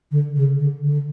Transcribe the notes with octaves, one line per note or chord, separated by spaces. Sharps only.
D3
C#3
D3
D3